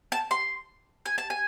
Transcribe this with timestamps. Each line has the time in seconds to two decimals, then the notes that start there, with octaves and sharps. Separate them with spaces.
0.12 A5
0.31 C6
1.06 G#5
1.18 A5
1.30 G#5